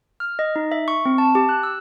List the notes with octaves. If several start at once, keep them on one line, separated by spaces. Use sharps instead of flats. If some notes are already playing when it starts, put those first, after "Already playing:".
F6
D#5
D#4
E5
C#6
C4
A5
G4
F#6
E6